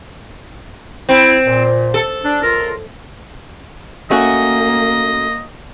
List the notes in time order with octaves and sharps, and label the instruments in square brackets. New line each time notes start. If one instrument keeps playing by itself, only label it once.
[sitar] C4 [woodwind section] E4
[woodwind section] A#2
[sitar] A4
[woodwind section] D4
C#2 F4 A#4
[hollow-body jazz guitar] A3 C#4 F#4 [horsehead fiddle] A#3 [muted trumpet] D#5